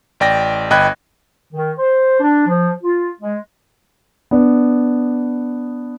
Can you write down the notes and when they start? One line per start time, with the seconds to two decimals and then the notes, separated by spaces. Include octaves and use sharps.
0.20 A1 D5 G5 A#6
0.70 G1 D#5 G5 B5 F#6 G#6
1.53 D#3
1.79 C5
2.20 D4
2.47 F3
2.83 F4
3.21 G#3
4.31 B3 D4